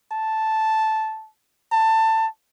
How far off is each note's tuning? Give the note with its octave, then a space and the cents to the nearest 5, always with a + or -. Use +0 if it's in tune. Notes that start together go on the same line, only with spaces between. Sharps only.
A5 -5
A5 +20